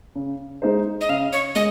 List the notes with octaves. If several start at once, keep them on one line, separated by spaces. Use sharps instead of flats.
C#3
G#3 D#4 G#4 C5
D#5
C#3 F5
C#5
G#3 D#5